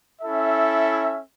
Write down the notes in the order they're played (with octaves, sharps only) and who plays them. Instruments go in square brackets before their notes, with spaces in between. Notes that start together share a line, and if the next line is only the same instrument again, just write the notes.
[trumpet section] C#4 E4 A4 E5